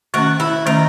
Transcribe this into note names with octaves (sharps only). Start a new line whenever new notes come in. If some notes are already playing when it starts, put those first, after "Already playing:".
D#3 A3 C#4 F#4
E4
D#3 A3 C#4 D#4